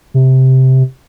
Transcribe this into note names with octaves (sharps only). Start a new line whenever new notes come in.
C3